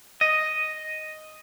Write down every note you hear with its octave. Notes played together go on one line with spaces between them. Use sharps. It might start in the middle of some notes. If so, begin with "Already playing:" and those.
D#5